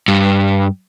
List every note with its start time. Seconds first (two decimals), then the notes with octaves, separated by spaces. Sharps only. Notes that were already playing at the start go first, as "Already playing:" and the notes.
0.08 G2